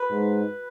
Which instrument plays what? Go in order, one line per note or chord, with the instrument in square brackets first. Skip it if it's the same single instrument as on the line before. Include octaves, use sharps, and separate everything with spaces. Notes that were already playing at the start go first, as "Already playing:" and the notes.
Already playing: [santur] B4
[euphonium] G#2